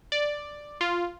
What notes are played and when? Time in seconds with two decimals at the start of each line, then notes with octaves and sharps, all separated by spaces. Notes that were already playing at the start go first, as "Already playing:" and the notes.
0.12 D5
0.81 F4